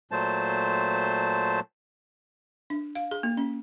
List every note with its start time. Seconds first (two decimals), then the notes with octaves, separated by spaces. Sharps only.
0.11 A#2 F#3 A3 C5 A5
2.70 D4
2.95 F5
3.11 G#4
3.23 A#3
3.37 C#4